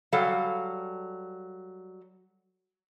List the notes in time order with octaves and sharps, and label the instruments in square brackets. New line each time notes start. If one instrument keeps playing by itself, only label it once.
[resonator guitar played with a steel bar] F#3 G3 A4 F5